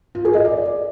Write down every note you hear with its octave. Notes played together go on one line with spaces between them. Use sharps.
F4
G#4
D#5
D5